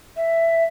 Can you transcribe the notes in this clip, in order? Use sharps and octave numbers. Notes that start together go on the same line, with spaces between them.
E5